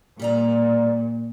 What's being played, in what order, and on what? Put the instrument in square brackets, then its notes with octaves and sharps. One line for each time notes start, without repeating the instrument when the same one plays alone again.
[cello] A#2 [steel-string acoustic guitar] G3 D5 A#5